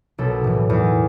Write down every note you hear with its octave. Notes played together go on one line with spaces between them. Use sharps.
B1 A4
A2 E3
E2